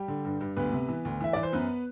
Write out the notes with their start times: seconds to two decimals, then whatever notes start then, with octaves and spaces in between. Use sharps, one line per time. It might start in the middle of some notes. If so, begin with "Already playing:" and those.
Already playing: G3 G4
0.08 D3
0.25 G2
0.41 G2
0.56 D2 B3 B4
0.73 C3
0.88 E3
1.05 D2
1.20 E3 E5
1.33 E3 D5
1.43 C5
1.53 F#2 B3 B4